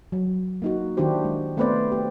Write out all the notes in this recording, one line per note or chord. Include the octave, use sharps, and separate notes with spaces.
F#3
A#3 D#4 F#4
D#3 D4 E4 F#4 G4 C5
G#3
A3 B3 C4 B4 C5 D5
G4